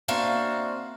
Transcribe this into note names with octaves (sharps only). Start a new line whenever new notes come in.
A#3 C4 D4 F#4 E5 F5